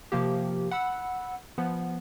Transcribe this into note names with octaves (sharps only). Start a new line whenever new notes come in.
C3 F3 A#3 G4
F#5 B5 E6
F3 B3